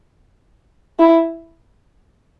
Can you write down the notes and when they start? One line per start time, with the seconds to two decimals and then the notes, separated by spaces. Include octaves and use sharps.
0.99 E4